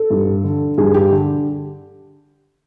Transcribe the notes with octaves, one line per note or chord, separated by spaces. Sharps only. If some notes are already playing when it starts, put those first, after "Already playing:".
Already playing: A4
G2
D3
G2 G#4
G4
D3